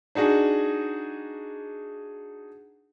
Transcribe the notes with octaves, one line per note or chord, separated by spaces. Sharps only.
D4 D#4 F#4 G#4